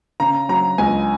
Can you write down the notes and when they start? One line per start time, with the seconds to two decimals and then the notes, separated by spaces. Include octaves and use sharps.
0.20 C#3 A#5
0.49 F#3 A#5
0.78 C#2 G#5